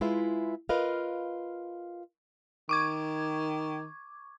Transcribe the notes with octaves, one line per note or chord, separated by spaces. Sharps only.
G#3 E4 F4 B4 E5
F4 A#4 B4 D#5 F5
D#3 C#6 D6 G#6